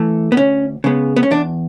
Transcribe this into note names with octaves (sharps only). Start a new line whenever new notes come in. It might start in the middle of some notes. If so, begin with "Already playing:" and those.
Already playing: E3 A3
B3
D2 C#4
C#3 G#3 B3
B3
C#4
E2 D4